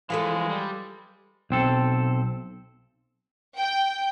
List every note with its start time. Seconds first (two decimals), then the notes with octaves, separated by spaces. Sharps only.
0.10 E3 F3 G#3 A4 B4 F5
0.50 G3
1.50 B1 C4 A4
3.58 G5